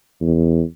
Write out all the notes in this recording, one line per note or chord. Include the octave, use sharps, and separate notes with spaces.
E2